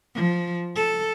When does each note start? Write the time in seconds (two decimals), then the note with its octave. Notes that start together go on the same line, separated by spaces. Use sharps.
0.15 F3
0.76 A4